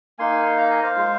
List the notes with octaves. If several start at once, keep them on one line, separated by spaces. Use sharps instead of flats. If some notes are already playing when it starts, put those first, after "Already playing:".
A#3 D#4 G#5 C6
F5 A#5
D#5 G#5
C5 F5
G#3 F4